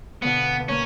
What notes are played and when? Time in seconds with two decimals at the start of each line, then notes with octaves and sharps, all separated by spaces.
0.22 B2 D3 B3 F5
0.69 A#3 C#4 C#5